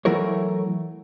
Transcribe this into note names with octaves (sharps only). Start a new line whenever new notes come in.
E3 F#3 A3 E4 A#4 C#5